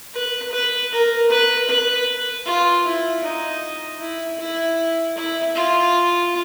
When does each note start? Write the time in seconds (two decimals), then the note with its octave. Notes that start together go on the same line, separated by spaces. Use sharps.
0.14 B4
0.52 B4
0.92 A#4
1.30 B4
1.69 B4
2.45 F4
2.85 E4
3.24 D#4
4.00 E4
4.39 E4
5.16 E4
5.55 F4